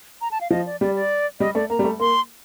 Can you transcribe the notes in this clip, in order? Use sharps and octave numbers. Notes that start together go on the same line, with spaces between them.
A#5
A5
F5
F3 D#5
D5
G3 D5
D5
G3 D#5
A3 D5
A#3 A#5
G3
A3
A#3 C6